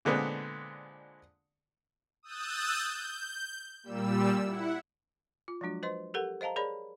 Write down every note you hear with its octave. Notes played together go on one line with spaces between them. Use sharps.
A#2 D3 G#3 B3 C4
D#6 E6 F#6 G6 A6
G6
A#2 G3 E6
E4 F#5
F4
F3 F#3 G#3 D4 F#4
B4 C5 D#5 C6
G4 A4 A#4 F#5
C5 D#5 F5 A5 A#5
G#4 A#4 C#5 D5 B5